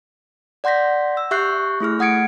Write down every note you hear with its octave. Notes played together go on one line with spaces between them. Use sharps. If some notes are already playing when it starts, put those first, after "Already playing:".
D5 F#5 C6 G6 A#6 B6
E6
G4 E5 C#6 F#6 G6 C7
A3 E4 G#4 F6
A3 F#5 D#6 G#6 C#7 D7